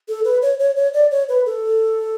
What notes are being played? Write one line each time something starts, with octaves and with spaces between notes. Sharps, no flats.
A4
B4
C#5
C#5
C#5
D5
C#5
B4
A4